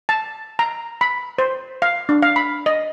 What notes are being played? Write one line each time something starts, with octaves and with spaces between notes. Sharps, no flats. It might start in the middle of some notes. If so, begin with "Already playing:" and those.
A5
A#5
B5
C5
F5
D4
F5
B5
D#5